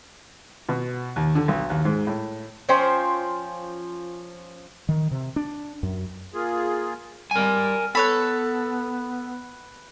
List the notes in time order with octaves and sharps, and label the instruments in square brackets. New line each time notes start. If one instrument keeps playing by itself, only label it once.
[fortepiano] B2
D#2
D3
B1
D#2
G#2
A2
[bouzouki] F3 C#4 C5 G5
[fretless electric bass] D#3
C3
D4
F#2
[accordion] A#3 F4 G#4
[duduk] G3 [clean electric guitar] A#4 G#5
[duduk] B3 [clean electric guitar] A4 [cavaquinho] B4 C#5 B5